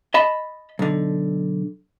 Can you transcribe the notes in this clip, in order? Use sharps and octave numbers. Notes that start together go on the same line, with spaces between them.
D#5 A5 B5
B1 D3